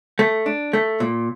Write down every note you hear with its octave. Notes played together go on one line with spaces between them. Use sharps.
A3
D4
A3
A#2